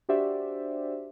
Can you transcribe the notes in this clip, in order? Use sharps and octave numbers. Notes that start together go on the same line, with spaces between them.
D4 F#4 G4 C5 D5 E5